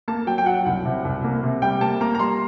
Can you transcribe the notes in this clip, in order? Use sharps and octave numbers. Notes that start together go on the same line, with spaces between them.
A#3 A5
F#3 G5
G5
F#3 F#5
C2 F#5
C3
C2
A#3
C3
G3 G5
A#3 A5
A#3 A#5
A#5
G3 C6